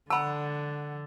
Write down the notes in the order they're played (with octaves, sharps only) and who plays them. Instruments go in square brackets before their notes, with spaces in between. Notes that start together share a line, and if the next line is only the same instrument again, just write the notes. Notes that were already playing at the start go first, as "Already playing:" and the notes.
[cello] D3 [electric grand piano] F#5 E6 [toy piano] A5 B5